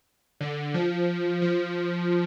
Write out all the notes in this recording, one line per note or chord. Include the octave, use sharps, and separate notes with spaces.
D3
F3
F3